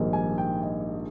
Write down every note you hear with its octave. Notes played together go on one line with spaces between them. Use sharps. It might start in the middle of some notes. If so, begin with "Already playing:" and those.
Already playing: A#1 G#2 D#3 G3 A#3
G#5
G5
D#5